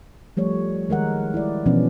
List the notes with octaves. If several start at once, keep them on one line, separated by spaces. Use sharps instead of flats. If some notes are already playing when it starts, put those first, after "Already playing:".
F3 G3 A3 C#5
D#3 G#3 A#4 F#5
E4 D5
B2 E3 F3 B3 C#4 D4